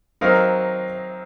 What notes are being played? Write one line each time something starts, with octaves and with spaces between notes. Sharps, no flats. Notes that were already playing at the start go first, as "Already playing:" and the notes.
F#3 C4 D#4 A#4 F5